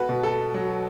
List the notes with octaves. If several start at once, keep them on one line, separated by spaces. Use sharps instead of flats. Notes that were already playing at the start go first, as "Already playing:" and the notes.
Already playing: B3 F#4 A4 B4
B2
A4
F#3